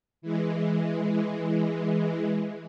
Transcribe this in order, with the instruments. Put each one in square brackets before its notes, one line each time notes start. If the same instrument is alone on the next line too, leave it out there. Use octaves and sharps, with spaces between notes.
[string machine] E3 G#3